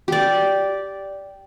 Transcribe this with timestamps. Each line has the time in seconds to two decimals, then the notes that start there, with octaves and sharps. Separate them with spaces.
0.08 G4 D5